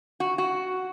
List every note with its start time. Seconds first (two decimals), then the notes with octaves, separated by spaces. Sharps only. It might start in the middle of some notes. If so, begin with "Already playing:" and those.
0.20 F#4
0.38 F#4